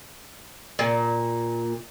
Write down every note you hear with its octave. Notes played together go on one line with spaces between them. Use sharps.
A#2